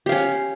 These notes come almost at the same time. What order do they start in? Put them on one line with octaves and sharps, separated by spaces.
G4 F5 C#4